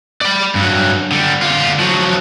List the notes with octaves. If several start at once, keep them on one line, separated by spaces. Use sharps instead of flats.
D5 B5
G2 F#3
D3 G3
D3 F4
F3 F#3